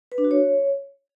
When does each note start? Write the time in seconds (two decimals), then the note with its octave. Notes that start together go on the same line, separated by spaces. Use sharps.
0.12 B4
0.18 D4
0.24 F#4
0.31 C#5